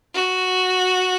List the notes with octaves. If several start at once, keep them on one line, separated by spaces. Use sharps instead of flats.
F#4